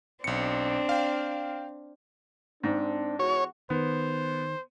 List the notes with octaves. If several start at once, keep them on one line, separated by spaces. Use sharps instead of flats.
B1 C4 D4 C#7
F5 G5
G#2 C4 D4
E2 F#4 C#5
D#3 B3 C5